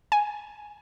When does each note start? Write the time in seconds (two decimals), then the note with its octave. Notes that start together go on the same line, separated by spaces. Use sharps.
0.12 G#5